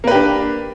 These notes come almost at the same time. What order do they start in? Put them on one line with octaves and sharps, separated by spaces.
A#3 B4 G4 D4